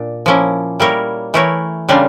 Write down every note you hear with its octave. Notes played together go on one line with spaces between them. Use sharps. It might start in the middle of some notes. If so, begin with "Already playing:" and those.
Already playing: A#2 D4
F3 A#3 C#4 E4
G3 A#3 E4 A#4 C#5
E3 A3 E4 A#4 C#5
C#3 G3 A#3 D4 F4